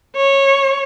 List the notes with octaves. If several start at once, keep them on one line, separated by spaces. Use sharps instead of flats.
C#5